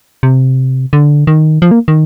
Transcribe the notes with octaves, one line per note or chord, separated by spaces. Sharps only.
C3
D3
D#3
F3
A#3
D#3